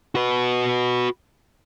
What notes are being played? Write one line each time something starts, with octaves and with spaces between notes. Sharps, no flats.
F#4 B4